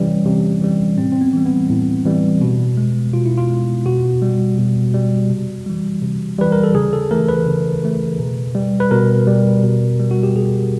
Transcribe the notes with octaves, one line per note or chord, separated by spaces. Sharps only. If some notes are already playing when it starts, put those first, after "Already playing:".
Already playing: C3 E3 G3 C#4
C3
E3 G3
A2 C4
C4
B3
E3 G3
B3
A2
E3 G3
B2
G#3
B2 F4
E4
F4
G#3
B2 F#4
G3
B2
G3
C3
E3 G3
C3
E3 G3 B4
A#4
A4
C#3 G#4
A4
E3 A3 A#4
B4
C#3
E3 A3
B2
G3
B4
B2 A#4
G3
B2
G3
F#4
G4
B2 G#4